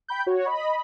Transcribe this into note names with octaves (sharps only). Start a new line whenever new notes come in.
G5 B5 G6
F#4 C#5
D#5 B5